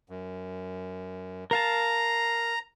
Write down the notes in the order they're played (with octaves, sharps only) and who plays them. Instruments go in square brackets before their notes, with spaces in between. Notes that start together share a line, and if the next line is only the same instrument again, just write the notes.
[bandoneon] F#2
[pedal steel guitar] A#4 F5 A5 [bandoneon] A#5